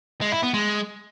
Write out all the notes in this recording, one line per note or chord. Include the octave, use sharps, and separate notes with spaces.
G#3
E4
B3
G#3